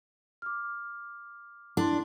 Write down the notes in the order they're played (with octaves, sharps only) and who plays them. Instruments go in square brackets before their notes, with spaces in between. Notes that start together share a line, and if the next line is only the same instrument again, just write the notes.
[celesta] D6 F6
[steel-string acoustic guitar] D4 [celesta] E4 C6